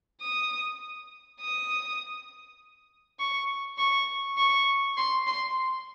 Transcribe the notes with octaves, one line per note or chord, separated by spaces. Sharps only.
D#6
D#6
C#6
C#6
C#6
C6
C6